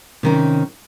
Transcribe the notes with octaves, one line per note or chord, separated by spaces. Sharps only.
C3 D#3 C#4